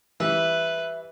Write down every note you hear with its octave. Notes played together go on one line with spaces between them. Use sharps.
E3 G3 B4 E5